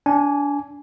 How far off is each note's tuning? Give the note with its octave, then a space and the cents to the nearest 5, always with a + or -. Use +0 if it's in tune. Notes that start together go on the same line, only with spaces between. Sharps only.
D4 -25 G#5 +0